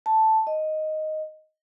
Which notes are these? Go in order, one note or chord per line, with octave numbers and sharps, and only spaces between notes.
A5
D#5